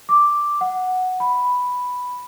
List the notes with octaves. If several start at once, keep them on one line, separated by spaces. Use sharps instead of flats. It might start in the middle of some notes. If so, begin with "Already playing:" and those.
D6
F#5
B5